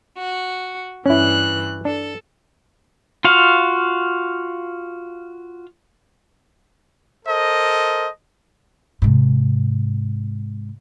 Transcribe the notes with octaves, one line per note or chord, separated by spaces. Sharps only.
F#4
G2 E3 C#4 E4 F#6
D4 A4
F4 F#4 F5
A4 A#4 C5 D#5
G#2 C3